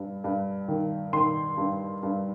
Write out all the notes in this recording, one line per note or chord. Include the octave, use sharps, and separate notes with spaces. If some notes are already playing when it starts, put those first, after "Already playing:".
Already playing: G2
G2
D#3
D#3 C6
G2
G2